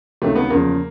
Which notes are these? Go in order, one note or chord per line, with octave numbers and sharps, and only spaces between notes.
C#2 C3 D#3 F#3 A3
B3
E2 C#3 F3 A#3